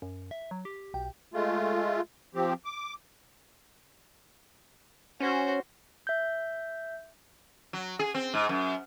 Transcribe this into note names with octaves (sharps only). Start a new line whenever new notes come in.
F#2
E5
F#3
G4
B1 G5
G#3 A3 F4
F3 C4 G4
D6
C#4 F#4 C5
E5 G6
F#3
G#4
C4
G#2
F#2